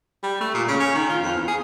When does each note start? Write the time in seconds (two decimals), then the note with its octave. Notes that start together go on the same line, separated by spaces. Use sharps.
0.23 G3
0.41 A3
0.54 A#2
0.68 C#3
0.80 C#4
0.95 D#3
1.10 F4
1.22 F2
1.35 E2
1.48 G#4